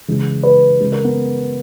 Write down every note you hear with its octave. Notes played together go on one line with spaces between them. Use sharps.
C#3 E3 G#3
B4
C#3 G#3
A#4
B3